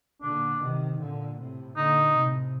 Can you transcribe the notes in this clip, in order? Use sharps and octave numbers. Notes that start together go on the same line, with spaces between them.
A#2 D3 D4
C3 D#3
A#2 D3
A2 C3
A#2 D3 D#4
A2 C3